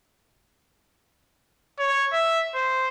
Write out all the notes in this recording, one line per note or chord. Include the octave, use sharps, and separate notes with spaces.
C#5
E5
C5